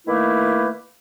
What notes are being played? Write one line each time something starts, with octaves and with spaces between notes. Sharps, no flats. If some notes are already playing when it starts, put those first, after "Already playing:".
D#3 A3 A#3 E4 B4